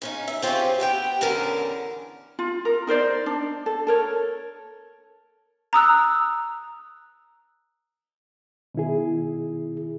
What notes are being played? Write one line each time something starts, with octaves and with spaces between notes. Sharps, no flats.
C#3 C#4 D#4
E5
C4 F4 G4 G#4 C#5
B3 G4 G5
E2 D3 C#4 A#4 A5
F4
A#4
D#4 A#4 C5 D5
D4
A4
A4 A#4 C#5
A#5 D#6 E6 F#6
B2 D#3 E4 G#4